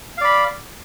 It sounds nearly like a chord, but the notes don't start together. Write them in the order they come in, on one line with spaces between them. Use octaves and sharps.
F5 D5 B5